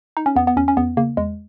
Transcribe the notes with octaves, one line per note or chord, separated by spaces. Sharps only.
D#4
C#4
E2 B3
B3
E2 C#4
C#4
E2 B3
C#3 A#3
E2 G#3